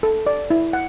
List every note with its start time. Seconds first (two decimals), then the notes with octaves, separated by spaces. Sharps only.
0.03 A4
0.27 D5
0.50 E4
0.73 F#5